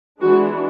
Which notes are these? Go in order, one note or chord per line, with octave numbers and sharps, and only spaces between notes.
E3 G#3 B3 D4 F#4